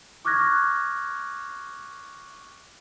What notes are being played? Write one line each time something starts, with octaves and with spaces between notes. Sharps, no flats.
C#6 D6 F6 F#6 G#6 A#6